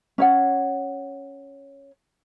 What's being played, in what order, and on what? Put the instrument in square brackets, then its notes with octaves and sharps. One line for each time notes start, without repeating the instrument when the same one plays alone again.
[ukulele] C#4 C#5 F#5